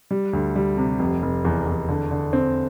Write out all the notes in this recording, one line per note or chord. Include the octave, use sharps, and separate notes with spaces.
G3
D2
G3
C3
F1
F1
E2
E2
D3
D3
C4